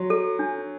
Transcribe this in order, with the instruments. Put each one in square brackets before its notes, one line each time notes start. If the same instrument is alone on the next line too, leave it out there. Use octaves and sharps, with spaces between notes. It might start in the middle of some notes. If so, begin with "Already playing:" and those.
Already playing: [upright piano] F#3 [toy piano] F#4
[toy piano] A4
D4